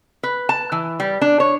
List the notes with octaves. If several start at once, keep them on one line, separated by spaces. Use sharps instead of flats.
B4
A5
E3
G3
D4
C#5